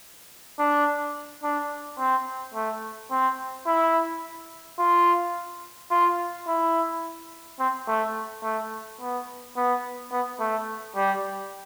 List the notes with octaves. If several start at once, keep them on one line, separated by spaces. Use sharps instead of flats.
D4
D4
C4
A3
C4
E4
F4
F4
E4
C4
A3
A3
B3
B3
B3
A3
G3